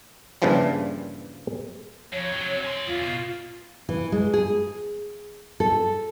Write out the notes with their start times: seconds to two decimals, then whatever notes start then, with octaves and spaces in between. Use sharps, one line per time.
0.42 G2 A#2 C#3 E3 F3 G3
2.13 F2 C#5
2.33 C3 F#3
2.64 C#4 C6
2.88 E2 F4
3.03 B2
3.89 E3
4.12 G#3
4.33 G#4
5.60 A4